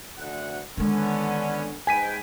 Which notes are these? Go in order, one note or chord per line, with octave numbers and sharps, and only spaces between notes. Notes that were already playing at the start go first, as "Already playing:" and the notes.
D2 F#5
D3 D#3 G#3 B3 C#4
G#2 B4 G5 G#5 B6 D#7